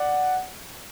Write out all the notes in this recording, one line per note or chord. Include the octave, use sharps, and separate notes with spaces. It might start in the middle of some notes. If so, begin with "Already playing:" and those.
Already playing: D5 F#5